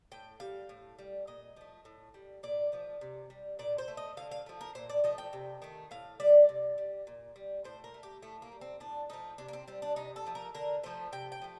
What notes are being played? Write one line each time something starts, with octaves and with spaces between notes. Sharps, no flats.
A2 G5
G3 F5
A2
G3
A#2 D#5
F3 A3
A2
G3
A#2 D5
F3 A3
C3
G3
A#2 D5
C5
A3
D#5
D3 F5
F5
F3 A3
A#4
A#2 C5
D5
F3 A3 D#5
G5
C3
D#3 A3
A2 F5
G3 D5
C3
G3
A#2
G3
A2 C5
A#4
A3
G4
A2 A3
A#3
G3
C4
A2 D4
F3 A3 D#4
C3 D4
A#3
C4
G3 C4
D4
C3 D#4
A4
F3 A3
A#4
D3 A#4
F3 A3 C5
C3 G5
G5
F3 A3